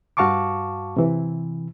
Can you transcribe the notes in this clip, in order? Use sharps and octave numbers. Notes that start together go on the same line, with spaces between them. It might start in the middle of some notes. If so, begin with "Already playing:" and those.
G2 F#4 F5 A5 C#6 D6
C3 E3